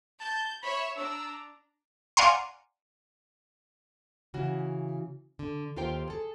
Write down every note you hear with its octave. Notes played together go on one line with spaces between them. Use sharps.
A5 G6
C#5 E5 B5
D4 A#5 E6
D5 F5 F#5 G#5 A#5 C6
C#3 E3 F#4
D3
D#2 F4 G4 A#4 C5 G5
G#4 A4